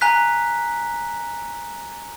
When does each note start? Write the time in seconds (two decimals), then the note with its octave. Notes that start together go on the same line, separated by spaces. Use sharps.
0.01 G#5 A#5 F#6 B6